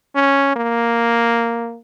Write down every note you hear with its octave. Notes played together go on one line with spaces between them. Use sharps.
C#4
A#3